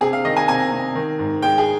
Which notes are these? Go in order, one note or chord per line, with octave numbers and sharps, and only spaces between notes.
C3 G#4
F5
D#3 D#5
G#5
C3 G#5
C3
D#3
G#2
G#3 G5
G#4